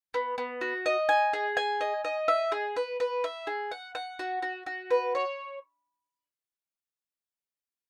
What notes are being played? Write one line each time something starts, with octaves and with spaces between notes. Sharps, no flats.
B3
B3
F#4
D#5
G#5
G#4
G#5
D#5
D#5
E5
G#4
B4
B4
E5
G#4
F#5
F#5
F#4
F#4
F#4
B4
C#5